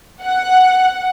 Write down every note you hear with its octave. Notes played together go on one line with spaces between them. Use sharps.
F#5